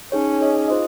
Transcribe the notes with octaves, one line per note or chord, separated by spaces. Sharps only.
C#4 D#4 G#4 C#5
D#4 G#4 D#5
F4 C5 D#5